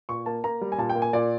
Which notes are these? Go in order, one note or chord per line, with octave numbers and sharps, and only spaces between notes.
A#2 C#6
A#3 A5
A#3 A#5
G3
G#5
A#2 A5
G5
A#3
G#5
A#2 D5